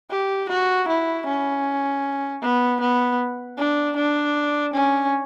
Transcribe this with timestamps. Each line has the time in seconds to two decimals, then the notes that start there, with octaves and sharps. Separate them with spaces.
0.11 G4
0.49 F#4
0.88 E4
1.26 C#4
2.42 B3
2.81 B3
3.58 D4
3.96 D4
4.73 C#4